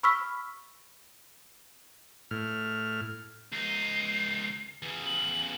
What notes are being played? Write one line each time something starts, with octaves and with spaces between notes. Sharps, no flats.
B5 C#6 E6 F6 B6
A2 F6
C#2 D#4 C7
E2 C#3
F#7